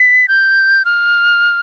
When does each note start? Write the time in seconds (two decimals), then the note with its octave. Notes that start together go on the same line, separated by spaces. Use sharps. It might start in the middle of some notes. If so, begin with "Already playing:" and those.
Already playing: B6
0.28 G6
0.85 F6